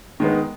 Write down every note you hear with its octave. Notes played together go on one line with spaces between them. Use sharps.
D#3 G#3 B3